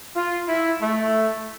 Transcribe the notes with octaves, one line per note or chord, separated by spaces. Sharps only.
F4
E4
A3